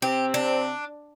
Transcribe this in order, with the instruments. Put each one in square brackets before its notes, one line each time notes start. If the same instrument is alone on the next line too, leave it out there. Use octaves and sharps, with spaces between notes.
[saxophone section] C3 C4 [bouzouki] G4
[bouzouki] D4